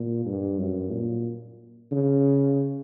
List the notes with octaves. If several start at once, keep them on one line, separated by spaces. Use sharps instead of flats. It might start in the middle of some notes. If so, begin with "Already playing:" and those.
Already playing: A#2
G2
F#2
A#2
C#3